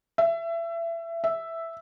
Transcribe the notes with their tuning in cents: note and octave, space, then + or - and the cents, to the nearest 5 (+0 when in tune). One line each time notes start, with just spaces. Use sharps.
E5 +25
E5 +0